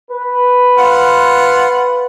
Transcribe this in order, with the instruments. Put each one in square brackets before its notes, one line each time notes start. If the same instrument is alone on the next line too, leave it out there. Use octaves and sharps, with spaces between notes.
[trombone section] B4
[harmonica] F4 F#5